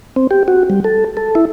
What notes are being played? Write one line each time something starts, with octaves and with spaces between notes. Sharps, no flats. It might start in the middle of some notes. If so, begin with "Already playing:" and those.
C4
G4
F#4
G3
A4
A4
E4